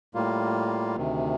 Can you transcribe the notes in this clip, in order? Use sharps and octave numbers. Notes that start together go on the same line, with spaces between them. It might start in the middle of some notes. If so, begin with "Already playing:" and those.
A2 G3 A#3 F4
D2 C3 D#3